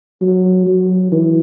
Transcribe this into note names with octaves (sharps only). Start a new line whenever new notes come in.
F#3
F#3
E3